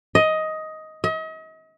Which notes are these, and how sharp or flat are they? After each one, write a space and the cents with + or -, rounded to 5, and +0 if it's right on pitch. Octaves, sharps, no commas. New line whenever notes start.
D#5 +10
D#5 +40